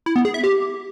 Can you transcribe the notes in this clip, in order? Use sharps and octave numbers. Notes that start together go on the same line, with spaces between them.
E4
B3
G#4
E5
G4